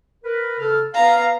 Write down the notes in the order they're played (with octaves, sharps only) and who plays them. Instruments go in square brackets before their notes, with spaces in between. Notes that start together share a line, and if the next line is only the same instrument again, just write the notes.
[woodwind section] A#4 B4
C#3 A4 F6
[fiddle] B3 A#5 [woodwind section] F5